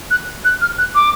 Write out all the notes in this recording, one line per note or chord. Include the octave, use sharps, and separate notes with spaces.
F#6
F#6
F6
F#6
D6